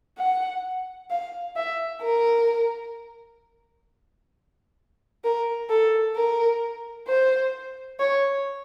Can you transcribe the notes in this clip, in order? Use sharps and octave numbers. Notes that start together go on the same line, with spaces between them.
F#5
F5
E5
A#4
A#4
A4
A#4
C5
C#5